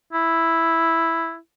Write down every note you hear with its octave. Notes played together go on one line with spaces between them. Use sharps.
E4